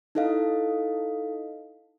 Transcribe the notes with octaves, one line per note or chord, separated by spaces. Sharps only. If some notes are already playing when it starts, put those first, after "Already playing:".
D#4 E4 A4 D#5 F5